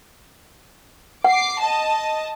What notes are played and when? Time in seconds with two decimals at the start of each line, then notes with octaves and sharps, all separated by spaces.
1.24 F#5 D6 C7
1.60 D#5 A5